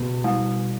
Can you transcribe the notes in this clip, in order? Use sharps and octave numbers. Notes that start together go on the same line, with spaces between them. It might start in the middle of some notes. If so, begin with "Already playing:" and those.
Already playing: B2 B3
G3